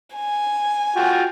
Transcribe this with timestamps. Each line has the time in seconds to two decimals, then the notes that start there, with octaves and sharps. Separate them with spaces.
0.15 G#5
0.96 F4 F#4 G5